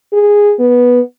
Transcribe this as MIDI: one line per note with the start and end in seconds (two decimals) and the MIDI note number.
0.13 0.53 68
0.59 1.01 59